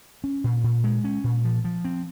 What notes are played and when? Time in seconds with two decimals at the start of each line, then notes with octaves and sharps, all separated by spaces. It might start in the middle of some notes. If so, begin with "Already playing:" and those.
0.24 C#4
0.44 A#2
0.64 A#2
0.84 G#3
1.04 C#4
1.24 A#2
1.44 F3
1.64 F3
1.85 C4